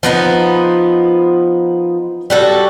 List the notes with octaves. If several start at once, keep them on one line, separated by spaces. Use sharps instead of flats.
F3 B3 D#4
G3 F#4 A4